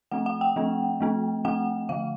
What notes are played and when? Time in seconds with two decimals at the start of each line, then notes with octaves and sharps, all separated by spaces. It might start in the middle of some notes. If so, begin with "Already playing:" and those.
0.11 F3 A3 C4 F#5
0.26 F#5
0.41 G5
0.56 F3 A3 C4
1.00 F3 A3 C4
1.45 F3 A3 C4 F#5
1.89 D3 F3 A3 F5